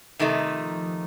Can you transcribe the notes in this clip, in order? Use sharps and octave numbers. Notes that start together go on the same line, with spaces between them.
C3 D#3 F3 A3 D#4